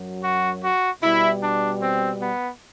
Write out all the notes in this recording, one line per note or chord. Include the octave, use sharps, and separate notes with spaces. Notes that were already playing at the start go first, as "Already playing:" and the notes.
Already playing: F#2 F#3
F#4
F#4
B2 G3 E4
D4
C4
B3